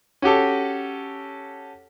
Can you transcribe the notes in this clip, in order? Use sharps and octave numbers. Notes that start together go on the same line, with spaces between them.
C#4 F#4 G4 A4